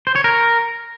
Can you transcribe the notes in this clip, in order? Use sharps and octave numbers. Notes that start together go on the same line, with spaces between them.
C5
C#5
A#4